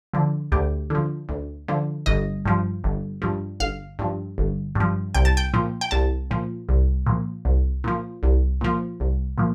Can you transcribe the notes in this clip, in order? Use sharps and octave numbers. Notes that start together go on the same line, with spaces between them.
D3 F3
D2 G4
D3 F3
D2
D3 F3
G1 D#5
G2 F3
G1
G2 F3
G1 F5
G2 F3
G1
G2 F3
C2 G5
A5
G5
A#2 F3
G5
C2 A5
A#2 F3
C2
A#2 F3
C2
A#2 F3
C2
A#2 F3
C2
A#2 F3